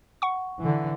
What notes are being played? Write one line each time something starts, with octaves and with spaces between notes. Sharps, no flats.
F#5 C#6
D3 E3